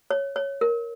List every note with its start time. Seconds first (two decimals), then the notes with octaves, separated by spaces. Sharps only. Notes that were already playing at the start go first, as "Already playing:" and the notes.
0.10 C#5
0.36 C#5
0.61 A#4